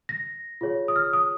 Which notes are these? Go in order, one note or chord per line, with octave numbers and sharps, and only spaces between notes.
A#6
F4 G#4 C#5
D#6
F6
D#6